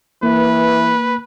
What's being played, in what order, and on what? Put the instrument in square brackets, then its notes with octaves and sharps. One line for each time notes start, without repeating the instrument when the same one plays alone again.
[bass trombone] E3 [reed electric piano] A#3 [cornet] B4